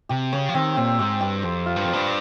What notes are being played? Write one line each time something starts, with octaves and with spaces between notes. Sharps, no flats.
C3 G4
C#3 C#5
F3
D#3 C4
A#2 C4
G#2 G4
G2 G4
F2 C5
F4
G2
F2 C5
G2